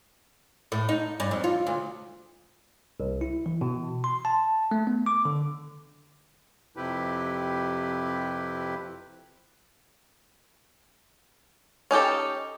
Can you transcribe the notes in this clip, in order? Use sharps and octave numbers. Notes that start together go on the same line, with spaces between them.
A2
D#4
G2
F2
F4
D2
C2
E4
E3
B2
C6
A5
A3
B3
D6
D3
F2 C3 E4 G4 B4
C#4 D#4 G4 A4